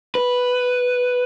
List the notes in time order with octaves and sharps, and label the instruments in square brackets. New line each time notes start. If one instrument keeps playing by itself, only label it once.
[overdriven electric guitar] B4